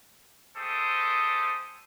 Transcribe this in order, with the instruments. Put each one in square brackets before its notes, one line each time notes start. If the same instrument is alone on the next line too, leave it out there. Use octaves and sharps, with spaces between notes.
[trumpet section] G#3 A3 G4 A4 C5 D#6